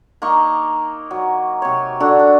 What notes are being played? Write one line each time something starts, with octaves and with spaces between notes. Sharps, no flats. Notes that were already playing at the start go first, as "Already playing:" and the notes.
A#3 D#4 A#5 C#6
F#3
C3 C#5
D3 D4 F#4 A4
A4